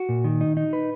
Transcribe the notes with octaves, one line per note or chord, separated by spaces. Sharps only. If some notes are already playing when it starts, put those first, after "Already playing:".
Already playing: F#4
A#2
D#3
D#4
D#4
B4